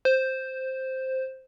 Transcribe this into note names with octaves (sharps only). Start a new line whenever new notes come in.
C5